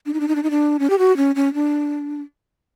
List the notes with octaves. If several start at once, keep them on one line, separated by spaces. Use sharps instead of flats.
D4
D#4
D4
D#4
D4
D#4
D4
C#4
G4
F#4
C#4
C#4
D4